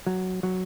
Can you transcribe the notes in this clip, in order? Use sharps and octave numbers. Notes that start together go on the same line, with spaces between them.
F#3
F#3